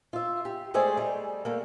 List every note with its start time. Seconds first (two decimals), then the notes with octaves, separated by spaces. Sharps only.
0.13 F4 E5
0.45 G4
0.74 G#3 A3 G#4 C5 D5
0.97 G3 A3
1.45 G3 A3 A#3